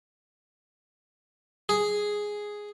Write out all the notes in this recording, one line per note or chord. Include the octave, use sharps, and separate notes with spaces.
G#4